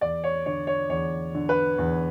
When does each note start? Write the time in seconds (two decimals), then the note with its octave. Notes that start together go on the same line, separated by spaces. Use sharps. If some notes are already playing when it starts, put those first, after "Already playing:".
0.01 E2 D5
0.24 C#5
0.46 D3 C#5
0.67 C#5
0.89 E2 C#5
1.35 D3
1.49 B4
1.78 E2